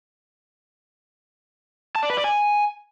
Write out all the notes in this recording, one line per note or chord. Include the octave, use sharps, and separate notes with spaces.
A5
D5
B4
D5
G#5